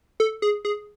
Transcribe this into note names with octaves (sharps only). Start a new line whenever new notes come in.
A4
G#4
G#4